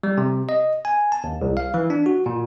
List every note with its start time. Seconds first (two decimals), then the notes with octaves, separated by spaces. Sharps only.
0.03 G3
0.18 C3
0.49 D#5
0.85 G#5
1.12 A5
1.24 D#2
1.42 C2
1.57 F5
1.74 E3
1.90 D4
2.06 F#4
2.26 A#2